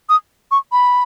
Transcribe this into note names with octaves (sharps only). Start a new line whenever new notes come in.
D#6
C#6
B5